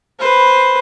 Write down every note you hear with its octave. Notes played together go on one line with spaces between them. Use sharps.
B4 C5